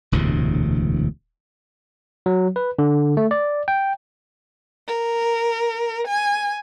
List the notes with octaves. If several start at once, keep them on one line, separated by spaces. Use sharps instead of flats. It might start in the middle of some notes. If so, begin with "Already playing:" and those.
E1 D2 A2 C3
F#3
B4
D3
A3
D5
G5
A#4
G#5